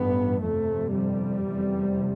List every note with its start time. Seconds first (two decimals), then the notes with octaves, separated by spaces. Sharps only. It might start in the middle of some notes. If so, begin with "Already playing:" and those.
Already playing: A1 G2 B3
0.42 G1 F2 C3 A3
0.94 G3
1.43 F1 E2 C3